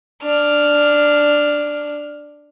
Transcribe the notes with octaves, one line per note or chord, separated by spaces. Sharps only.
D4 F6